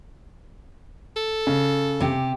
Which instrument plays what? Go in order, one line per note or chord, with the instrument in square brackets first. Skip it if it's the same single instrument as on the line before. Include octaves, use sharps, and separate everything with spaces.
[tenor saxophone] A4
[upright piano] C#3
[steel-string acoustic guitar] C3 G4